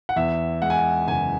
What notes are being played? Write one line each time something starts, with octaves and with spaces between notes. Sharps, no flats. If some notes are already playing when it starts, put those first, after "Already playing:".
F#5
E2 E5
G#3 F#5
G#5
F#5
F#1 G#5